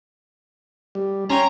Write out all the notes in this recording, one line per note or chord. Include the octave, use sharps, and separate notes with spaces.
G3
C#4 C#5 G5 A#5 C6